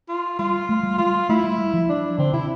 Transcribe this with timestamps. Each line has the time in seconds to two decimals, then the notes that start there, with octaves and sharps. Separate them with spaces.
0.09 F4
0.39 G3 F4
0.69 A3
0.83 G3
0.98 G3 F4
1.29 A3 E4
1.44 G3
1.58 G3
1.73 F3
1.89 D4
2.18 D3 C4
2.33 C3 E4